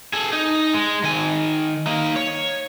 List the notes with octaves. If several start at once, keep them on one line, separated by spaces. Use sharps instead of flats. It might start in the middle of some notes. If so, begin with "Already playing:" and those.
G#4 A4
D#4
G#3
D#3 G#5
A#3 D#4
C#5